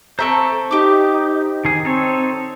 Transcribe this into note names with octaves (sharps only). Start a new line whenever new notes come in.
C4 A4 C5 E5 A#5 C#6
D#4 G4 D6
D#3 G#4
C4 D#4 A4 C#5